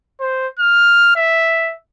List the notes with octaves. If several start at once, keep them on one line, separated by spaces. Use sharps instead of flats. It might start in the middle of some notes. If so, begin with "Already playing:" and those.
C5
F6
E5